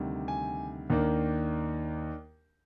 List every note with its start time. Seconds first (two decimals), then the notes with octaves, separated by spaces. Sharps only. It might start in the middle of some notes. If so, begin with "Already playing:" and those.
Already playing: D2 C3 D#3 G3
0.28 G#5
0.90 D#2 D#3 A#3 D4